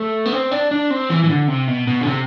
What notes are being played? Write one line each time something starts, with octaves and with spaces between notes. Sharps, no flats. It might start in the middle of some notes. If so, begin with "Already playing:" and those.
Already playing: A3
B3
C4
D4
D4
C4
E3
E3
D3
C3
B2
B2
D3
C3